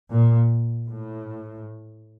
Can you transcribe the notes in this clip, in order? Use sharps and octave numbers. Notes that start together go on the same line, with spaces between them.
A#2
A2